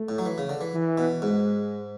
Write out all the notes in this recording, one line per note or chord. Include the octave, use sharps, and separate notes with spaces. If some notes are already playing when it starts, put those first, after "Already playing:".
Already playing: A3
A2
F#3
E3
C#3
D3
E3
E3
B2
G#2 G#3